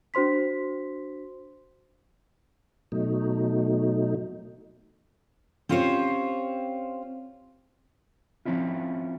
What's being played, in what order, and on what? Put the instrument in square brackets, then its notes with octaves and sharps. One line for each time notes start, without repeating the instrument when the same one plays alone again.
[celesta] D4 F#4 C5 C6 B6
[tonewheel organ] B2 F#3 A3 D#4
[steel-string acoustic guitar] C4 C#4 F4 G4 C5 C#5
[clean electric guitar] F3 C4 C#4 E4 F4